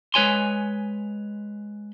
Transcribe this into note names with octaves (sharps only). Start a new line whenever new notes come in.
G#3 B4 C#5 G#5 C6